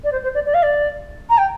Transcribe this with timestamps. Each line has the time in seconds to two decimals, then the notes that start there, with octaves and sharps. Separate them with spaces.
0.04 D5
0.12 C5
0.23 C5
0.34 D5
0.45 D5
0.54 F5
0.62 D5
1.29 A#5
1.37 G5